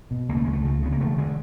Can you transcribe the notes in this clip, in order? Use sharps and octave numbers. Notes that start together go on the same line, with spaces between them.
B2
C#2 A#3
A3
C#2 G#3
A3
C#3
C#3 B3
A#3
E1 A3
D3 G#3